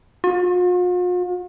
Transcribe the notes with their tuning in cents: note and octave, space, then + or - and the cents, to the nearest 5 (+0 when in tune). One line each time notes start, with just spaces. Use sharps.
F4 +45